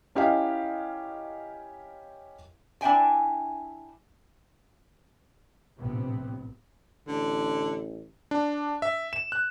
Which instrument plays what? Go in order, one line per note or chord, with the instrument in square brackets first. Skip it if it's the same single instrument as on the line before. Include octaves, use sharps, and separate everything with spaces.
[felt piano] C#4 E4 G4 A#4 D#5 F5
[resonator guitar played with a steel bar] D4 E4 E5 G5 G#5
[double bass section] A#1 A2 C3 B3 C4
[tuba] A1 [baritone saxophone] D3
[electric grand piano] D4
E5
E7
F#6